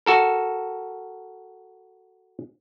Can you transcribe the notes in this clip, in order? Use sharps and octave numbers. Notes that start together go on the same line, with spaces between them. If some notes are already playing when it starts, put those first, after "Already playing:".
F#4 A4 A#4